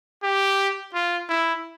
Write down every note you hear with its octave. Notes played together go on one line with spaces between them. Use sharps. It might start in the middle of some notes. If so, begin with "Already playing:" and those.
G4
F4
E4